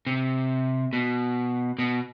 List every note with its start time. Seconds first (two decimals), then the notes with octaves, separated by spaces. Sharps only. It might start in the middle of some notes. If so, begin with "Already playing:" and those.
0.07 C3
0.93 B2
1.79 B2